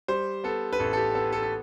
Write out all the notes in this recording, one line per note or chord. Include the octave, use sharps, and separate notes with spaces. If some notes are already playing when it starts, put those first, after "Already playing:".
G3 C5
B3 A4
B4
A1 A4
A4
G4
B3 A4
A4
A4